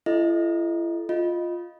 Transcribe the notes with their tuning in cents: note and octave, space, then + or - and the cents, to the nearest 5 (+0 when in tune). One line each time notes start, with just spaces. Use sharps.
E4 +40 A4 -30 D#5 +0
F4 +0 D#5 +0